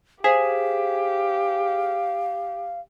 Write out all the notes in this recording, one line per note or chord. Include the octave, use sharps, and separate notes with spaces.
G4 G#4 C5 F5 B6 E7